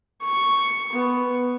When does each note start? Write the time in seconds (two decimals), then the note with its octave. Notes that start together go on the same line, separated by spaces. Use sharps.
0.23 C#6
0.92 B3